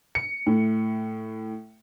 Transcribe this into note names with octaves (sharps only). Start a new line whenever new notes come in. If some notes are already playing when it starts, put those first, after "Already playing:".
C#7
A2